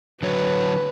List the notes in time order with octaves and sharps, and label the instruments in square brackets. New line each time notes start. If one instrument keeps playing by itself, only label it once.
[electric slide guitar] D3 F#3 C#5 [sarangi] B4